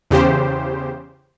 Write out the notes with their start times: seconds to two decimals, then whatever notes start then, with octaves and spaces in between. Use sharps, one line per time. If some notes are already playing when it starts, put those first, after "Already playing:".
0.11 E2 C#3 G4 C5